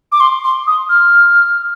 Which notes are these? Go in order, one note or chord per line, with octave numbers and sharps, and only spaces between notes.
D6
C6
C6
D#6
F6